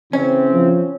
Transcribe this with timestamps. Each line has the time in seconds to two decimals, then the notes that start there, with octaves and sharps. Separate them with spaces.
0.13 C#3 E3 C4 C#4
0.54 F3